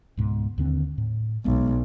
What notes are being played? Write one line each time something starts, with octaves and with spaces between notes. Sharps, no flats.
C#2 G#2 B2
D#2 D3 C4
A2
B1 G#3 B3